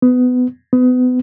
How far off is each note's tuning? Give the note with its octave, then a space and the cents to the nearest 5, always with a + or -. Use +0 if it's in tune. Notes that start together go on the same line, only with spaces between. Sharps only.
B3 +20
B3 +30